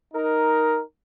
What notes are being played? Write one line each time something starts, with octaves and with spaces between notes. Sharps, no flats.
D#4 A#4